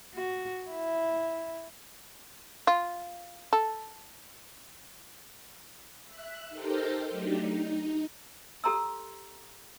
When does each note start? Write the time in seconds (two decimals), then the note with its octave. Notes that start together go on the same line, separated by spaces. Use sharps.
0.15 F#4
0.70 E4
2.67 F4
3.53 A4
6.05 E5 F#6
6.49 D#4 G4 A4 A#4 C5
7.10 F#3 A3 D4 D#4 G4
7.38 D#4
8.64 G4 A4 A#5 C6 E6